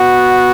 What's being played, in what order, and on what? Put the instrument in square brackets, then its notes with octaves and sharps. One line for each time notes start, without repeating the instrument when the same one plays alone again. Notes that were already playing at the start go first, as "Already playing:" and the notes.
Already playing: [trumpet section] B3 F#4